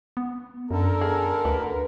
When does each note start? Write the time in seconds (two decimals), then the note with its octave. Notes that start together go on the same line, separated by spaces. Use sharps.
0.17 B3
0.71 F#2 D3 A4 A#4
1.01 G#4
1.45 D2 B4